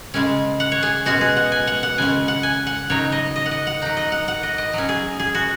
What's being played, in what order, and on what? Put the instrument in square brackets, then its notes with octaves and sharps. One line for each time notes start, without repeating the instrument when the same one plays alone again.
[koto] C#3 G#3 C#4
F#5
C#5
G#4
B2 G#3 C#4 F#4
G#4
F#5
G#5
F#5
F#5
C#3 G#3 C#4 G#5
F#5
G#5
F#5
C#3 F#3 D#4 C#5
D#5
D#5
F#5
D#5
F#5
F#3 D#4 F#5
D#5
F#5
F#5
D#5
D#5
F#3 C#4
G#4
G#4
F#4